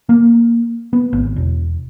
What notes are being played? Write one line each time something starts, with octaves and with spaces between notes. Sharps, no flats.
A#3
B3
G#1
E1